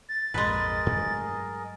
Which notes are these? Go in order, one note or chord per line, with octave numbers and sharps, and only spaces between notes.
A6
A#1 F2 G#2 G#3 G#4 A#4 B4 D#5
G2 F#3 A3